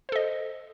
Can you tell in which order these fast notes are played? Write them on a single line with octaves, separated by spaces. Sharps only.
C5 A4 D#5